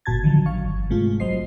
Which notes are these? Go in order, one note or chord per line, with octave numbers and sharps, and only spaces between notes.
G1 A#2 F#4 A5 G#6 A6
A1 D3 D#3 F3 F#3
F5 C#6
G1
G#2 C3 G#3 A3 F4
A#1 F#3 C5 D#5 C7